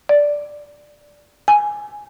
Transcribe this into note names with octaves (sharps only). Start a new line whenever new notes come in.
D5
G#5